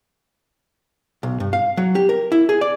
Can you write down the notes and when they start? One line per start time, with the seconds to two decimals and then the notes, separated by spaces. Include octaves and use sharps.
1.23 B1
1.40 G2
1.53 F5
1.77 F#3
1.95 G4
2.09 A#4
2.32 E4
2.49 G#4
2.61 D5